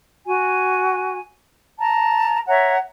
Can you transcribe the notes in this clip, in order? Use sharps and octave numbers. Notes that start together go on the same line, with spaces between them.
F#4 G#5
A5 A#5
C#5 E5 F#5 A#5